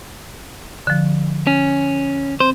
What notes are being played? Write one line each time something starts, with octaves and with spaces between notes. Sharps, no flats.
D3 F3
C#4
C4 C5